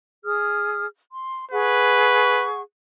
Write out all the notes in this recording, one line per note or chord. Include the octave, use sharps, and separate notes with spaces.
G#4 D#6 F6
C6
G#4 B4 F#5 C#6